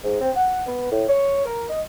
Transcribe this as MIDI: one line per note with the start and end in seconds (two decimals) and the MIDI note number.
0.04 0.19 44
0.21 0.30 60
0.36 0.60 78
0.67 0.91 59
0.91 1.04 45
1.08 1.44 73
1.45 1.67 70
1.69 1.80 75